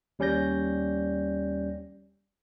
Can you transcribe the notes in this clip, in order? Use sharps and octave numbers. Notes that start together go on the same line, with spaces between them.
D#2 G3 C#4 D5 G6 A#6